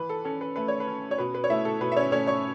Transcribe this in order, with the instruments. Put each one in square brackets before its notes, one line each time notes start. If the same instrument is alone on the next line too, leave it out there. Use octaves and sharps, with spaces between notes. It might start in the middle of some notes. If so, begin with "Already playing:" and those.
Already playing: [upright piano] E3 B4
A4
C#4 A4
B4
A3 B4
C#5
B4
C#4
C#5
B2 B4
B4
C#5
A3 E4 E5
A4
B2 B4
E5
C#4 C#5
A3 C#4 C#5
C#5 C#6